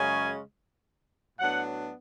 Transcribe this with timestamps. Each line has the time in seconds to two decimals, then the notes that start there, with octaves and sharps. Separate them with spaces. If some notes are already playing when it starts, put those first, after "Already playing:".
Already playing: F#2 C#3 G#3 C#4 G#5
1.39 A2 F#3 B3 D4 F#5